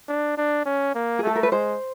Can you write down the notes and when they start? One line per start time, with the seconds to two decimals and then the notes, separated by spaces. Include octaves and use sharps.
0.09 D4
0.37 D4
0.66 C#4
0.95 A#3
1.19 G#4
1.23 A3 A4
1.36 A#4
1.43 B4
1.52 G#3 C5